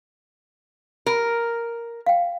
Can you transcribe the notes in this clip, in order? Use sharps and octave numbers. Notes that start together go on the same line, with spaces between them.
A#4
F5 G5